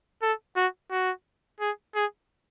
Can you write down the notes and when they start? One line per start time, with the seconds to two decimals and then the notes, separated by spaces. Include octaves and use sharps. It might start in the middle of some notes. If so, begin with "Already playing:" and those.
0.23 A4
0.56 F#4
0.91 F#4
1.60 G#4
1.95 G#4